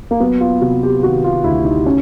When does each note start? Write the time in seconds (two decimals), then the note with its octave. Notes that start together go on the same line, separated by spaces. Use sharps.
0.11 A#3
0.20 F#3 B3
0.40 F4
0.61 C3 F#4
0.83 G4
1.03 D#3 F#4
1.24 F4
1.44 D2 E4
1.65 D#4
1.86 C#4